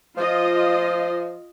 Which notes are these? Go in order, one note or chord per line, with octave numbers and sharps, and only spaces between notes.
F3 F4 D#5